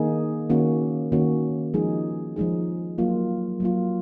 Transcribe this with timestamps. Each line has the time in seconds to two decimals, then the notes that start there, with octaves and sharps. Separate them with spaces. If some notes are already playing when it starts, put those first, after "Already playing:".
Already playing: D#3 A#3 D#4 G#4
0.50 D#3 A#3 C#4 F#4
1.12 D#3 A#3 C#4 F#4
1.74 F3 G#3 D#4 G#4
2.36 F3 G#3 D#4 G#4
2.98 F#3 A#3 F4
3.60 F#3 A#3 F4